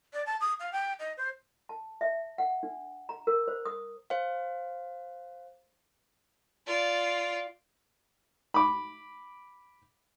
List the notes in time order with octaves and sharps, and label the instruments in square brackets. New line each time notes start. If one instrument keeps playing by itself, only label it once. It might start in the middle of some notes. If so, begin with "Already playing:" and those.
[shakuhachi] D5
A5
D#6
F5
G5
D#5
C5
[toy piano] A5
E5
F#5
D4
A#5
A#4
C5
D#6
[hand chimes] C5 F5
[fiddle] F4 D5
[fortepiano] B5 D6